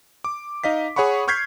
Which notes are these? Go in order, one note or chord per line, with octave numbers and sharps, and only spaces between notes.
D6
D#4 D#5 F5 B6
G#4 C#5 F#5 B5 C#6
C#6 F6 G6 G#6 B6 C7